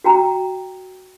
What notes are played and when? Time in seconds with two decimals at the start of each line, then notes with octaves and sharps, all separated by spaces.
0.04 F#4 G5 A#5